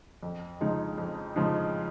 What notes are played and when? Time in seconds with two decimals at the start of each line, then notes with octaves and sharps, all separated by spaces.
0.23 F2
0.61 C#3 F3 G#3 D#4
0.98 F2
1.36 C#3 F3 G#3 D#4